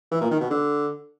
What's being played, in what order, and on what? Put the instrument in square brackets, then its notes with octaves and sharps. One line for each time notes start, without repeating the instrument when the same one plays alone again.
[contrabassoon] E3
A#2
D#3
B2
D3